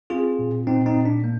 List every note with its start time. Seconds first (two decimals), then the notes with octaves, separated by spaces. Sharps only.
0.10 C4 F4 G#4
0.39 A#2
0.67 A#2 C4 D#4
0.86 C4 D#4
0.96 A#2
1.05 D4
1.24 A#3